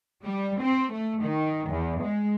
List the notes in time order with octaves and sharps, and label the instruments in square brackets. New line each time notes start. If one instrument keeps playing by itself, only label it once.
[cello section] G3
C4
A3
D#3
E2
G#3